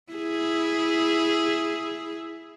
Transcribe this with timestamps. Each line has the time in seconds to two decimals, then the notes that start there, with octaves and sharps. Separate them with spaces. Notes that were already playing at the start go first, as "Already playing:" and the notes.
0.12 E4 G#4